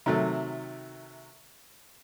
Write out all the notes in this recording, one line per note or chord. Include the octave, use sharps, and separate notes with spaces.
C3 D#3 F#3 A3